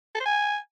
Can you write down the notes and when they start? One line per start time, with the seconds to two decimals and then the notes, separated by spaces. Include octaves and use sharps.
0.15 A4
0.20 C5
0.25 G#5